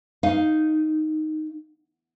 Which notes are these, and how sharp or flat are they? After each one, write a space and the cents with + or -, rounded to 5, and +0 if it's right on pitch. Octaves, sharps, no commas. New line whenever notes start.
D#4 +0 F5 +0